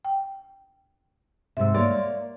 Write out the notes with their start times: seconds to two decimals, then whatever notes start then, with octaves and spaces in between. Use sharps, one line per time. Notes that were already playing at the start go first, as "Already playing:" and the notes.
0.05 G5
1.57 G#2 C3 E5 E6
1.74 A#3 C#5 D5 C6